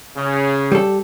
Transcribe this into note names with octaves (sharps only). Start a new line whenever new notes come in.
C#3
G3 A4